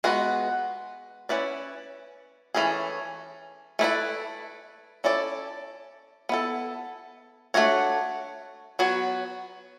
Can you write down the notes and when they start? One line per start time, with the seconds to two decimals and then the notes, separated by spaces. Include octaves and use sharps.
0.04 G#3 B3 F#4 B4
1.29 C#4 E4 B4 D5
2.54 E3 A3 C#4 G#4
3.79 A3 E4 B4 D5
5.04 C#4 E4 A4 D5
6.29 B3 E4 A4
7.54 A3 D4 F#4 C#5
8.79 F#3 B3 F#4 C#5